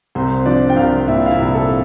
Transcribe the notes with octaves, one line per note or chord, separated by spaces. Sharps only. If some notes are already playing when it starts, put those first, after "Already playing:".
C2 C4 C5
F3 D4 D5
G5
C2 F4 F5
A#2 E4 E5
F5
E4 E5
C2
A4